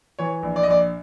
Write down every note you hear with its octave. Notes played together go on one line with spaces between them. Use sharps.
E3 C#5
A#1
D5
D#5
A#1 D5